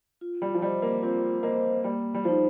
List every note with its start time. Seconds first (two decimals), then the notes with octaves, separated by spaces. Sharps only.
0.21 F4
0.42 G3
0.55 F3
0.62 G3 C5 D#5
0.82 A#3
1.02 C4 F4
1.43 A#3 C5 D#5
1.84 G3 A#3
2.14 G3
2.24 F3 D#4 C5